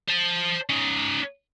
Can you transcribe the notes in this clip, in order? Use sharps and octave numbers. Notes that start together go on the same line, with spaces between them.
C5 A5
C#4 D#4